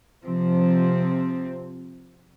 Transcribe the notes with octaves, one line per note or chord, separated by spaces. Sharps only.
C3 F3 C4